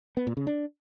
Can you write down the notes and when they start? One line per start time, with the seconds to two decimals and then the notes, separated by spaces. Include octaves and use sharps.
0.17 B3
0.27 A#2
0.37 C#3
0.47 D4